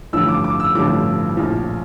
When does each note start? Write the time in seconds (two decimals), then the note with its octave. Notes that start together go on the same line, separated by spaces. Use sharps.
0.13 A1 G2 D3 F3 E6
0.28 D6
0.44 D6
0.60 E6
0.75 A1 G2 D3 F3 D6
1.37 A#1 A2 F3